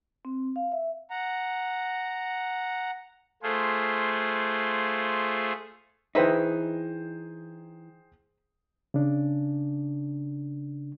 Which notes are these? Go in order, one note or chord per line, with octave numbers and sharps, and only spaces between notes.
C4
F5
E5
F#5 A#5
A3 F4 G#4 C5
E3 D#4 G#4 B4 C5 E5 G5
C#3 D4